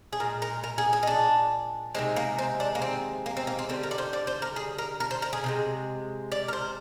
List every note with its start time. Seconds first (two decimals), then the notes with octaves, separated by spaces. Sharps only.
0.12 G#4
0.20 A#2 G#3 A#4
0.42 A#4
0.64 A#4
0.78 G#4
0.93 G#4
1.03 D#4
1.07 D4
1.95 C3 D#3 G#3 C4
2.16 A#3
2.39 C4
2.60 D4
2.75 A#3
2.82 C4
3.26 A#3
3.37 C4
3.47 A#3
3.59 C4
3.69 D3 G3 C4
3.83 A#4
3.91 D5
3.98 C5
4.13 D5
4.27 C5
4.42 A#4
4.56 G#4
4.78 A#4
5.00 A#4
5.11 C5
5.22 A#4
5.33 G#4
5.44 C3 D#3 G#3
6.32 D5
6.48 A#4
6.53 C5